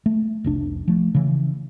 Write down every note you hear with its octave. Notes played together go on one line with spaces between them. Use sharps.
A3
F1 C2 D4
F3 A3
C#3 E3